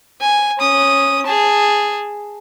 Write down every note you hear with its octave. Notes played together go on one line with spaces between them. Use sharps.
G#5
C#4 D#6
G#4 A5